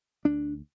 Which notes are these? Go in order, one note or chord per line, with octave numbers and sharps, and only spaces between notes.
D2 D4